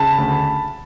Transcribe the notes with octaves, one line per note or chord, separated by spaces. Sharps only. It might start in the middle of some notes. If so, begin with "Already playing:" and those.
Already playing: C#3 A5 B5
D2